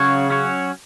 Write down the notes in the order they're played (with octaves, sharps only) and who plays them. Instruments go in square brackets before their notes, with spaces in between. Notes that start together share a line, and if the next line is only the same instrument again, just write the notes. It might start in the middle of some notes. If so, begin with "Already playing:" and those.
Already playing: [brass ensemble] C#3 [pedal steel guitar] F#3 C#4 F#4 C#5
[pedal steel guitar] F#3 C#4 F#4 C#5